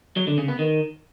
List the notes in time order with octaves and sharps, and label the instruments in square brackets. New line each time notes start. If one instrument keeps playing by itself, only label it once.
[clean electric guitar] F#3
D3
C#3
B3
D#3